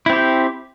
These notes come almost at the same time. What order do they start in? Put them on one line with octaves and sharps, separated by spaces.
E4 C4 G4